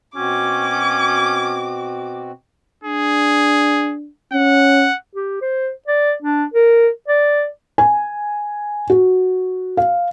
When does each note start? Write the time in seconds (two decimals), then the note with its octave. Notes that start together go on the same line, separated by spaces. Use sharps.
0.16 B2 C4 C#4 F#4 D6
2.84 D4 G#4
4.33 C#4 F#5
5.15 G4
5.42 C5
5.88 D5
6.22 D4
6.54 A#4
7.08 D5
7.78 G#5
8.90 F#4
9.77 F5